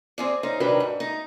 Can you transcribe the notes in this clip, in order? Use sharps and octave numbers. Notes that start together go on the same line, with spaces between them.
C4 G#4 D5
C#4 D#4 C5
C3 D#3 F#3 G3 D4 B4
G#2
D#4